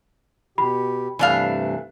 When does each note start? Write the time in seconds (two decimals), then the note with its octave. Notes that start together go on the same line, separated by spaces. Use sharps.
0.58 B2 G4 B5
1.19 G2 C3 E3 A3 D4 F5